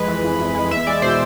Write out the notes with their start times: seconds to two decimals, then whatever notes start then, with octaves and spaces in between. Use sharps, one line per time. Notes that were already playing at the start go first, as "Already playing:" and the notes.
Already playing: F2 G#3 B4
0.08 E3
0.24 F2
0.39 F2
0.55 G#3
0.71 E2 E5
0.87 G#3 D5
1.02 B2 C5